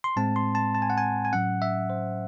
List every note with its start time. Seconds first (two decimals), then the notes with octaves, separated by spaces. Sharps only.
0.04 C6
0.16 A2 G#3 C4 A5
0.36 C6
0.55 A5
0.75 A5
0.82 G#5
0.90 F#5
0.98 G#5
1.25 G#5
1.32 A2 F#3 C#4 F#5
1.62 E5
1.90 C5